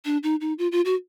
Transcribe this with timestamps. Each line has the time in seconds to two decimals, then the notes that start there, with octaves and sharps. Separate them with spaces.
0.05 D4
0.23 D#4
0.41 D#4
0.59 F4
0.72 F4
0.85 F#4